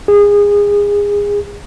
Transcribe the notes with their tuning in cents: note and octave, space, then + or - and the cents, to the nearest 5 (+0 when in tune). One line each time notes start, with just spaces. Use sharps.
G#4 -25